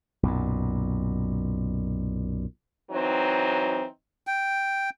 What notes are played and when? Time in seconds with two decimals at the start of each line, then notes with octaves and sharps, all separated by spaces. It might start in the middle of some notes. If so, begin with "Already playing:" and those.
0.23 B1 F#2 A#2
2.91 E3 F#3 C4 D#4
4.27 G5